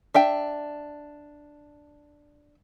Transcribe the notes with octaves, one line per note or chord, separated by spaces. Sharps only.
D4 E5 G5